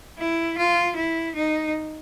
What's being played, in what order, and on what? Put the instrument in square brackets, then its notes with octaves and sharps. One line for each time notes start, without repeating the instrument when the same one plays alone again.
[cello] E4
F4
E4
D#4